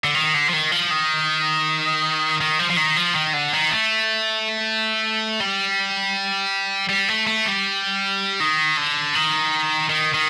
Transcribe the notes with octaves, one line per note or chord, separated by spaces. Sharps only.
D3
D#3
D3
F3
D#3
F3
D#3
D#3
F3
F3
D#3
F3
D#3
D3
D#3
A3
G3
G3
A3
A3
G3
D#3
D3
D#3
D#3
D#3